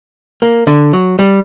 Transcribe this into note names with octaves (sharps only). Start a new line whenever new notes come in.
A#3
D3
F#3
G3